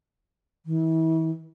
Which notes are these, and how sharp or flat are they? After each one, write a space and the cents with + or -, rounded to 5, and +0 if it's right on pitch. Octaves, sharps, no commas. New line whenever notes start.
E3 -35